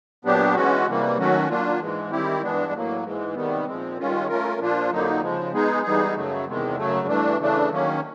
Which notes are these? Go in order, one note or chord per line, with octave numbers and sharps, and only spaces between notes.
A#2 F#3 B3 D4 G4
E3 G#3 C#4 F#4
C3 E3 G3 A#3
D#3 F#3 A3 C#4 F#4
F#3 A#3 D4 F4
G#2 E3 G#3
D#3 G3 C4 E4 G4
G2 E3 G#3 B3 D4
A2 F#3 A#3
G#2 E3 G#3
C3 D#3 G3 B3
A#2 F3 G#3 C4
G2 D#3 G#3 C#4 F4
A3 C#4 F4 A#4
A#2 F3 A#3 D4 F4
F2 D3 F#3 A#3 D#4
C#3 F3 G#3
G#3 B3 D#4 G#4
E3 G3 B3 D#4 G#4
F#2 C#3 F#3 A3
E2 C3 D#3 G#3
F#2 C#3 F#3 A3
G2 E3 A3 D4
C#3 E3 A3 D4
D#3 F#3 A#3 C#4